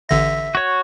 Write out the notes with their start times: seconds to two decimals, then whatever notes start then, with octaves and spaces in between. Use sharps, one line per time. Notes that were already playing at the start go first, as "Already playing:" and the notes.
0.09 A1 D3 E5 A#6
0.55 F#4 C#5